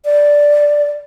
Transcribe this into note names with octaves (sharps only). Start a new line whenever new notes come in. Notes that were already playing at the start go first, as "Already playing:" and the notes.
D5